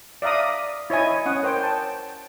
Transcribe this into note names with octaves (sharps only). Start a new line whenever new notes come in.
D5 E5 F5 A#5 D#6
E4 C#5 D#5 G#5
C#4 C#5 F#5 D#6
A#4 C5 C#5 G5
G5 A5